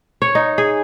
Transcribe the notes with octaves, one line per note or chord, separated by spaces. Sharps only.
C#5
D#4
G#4